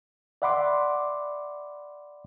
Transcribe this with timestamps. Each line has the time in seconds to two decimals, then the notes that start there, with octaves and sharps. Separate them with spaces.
0.42 D5 E5 F#5 B5 C6 D6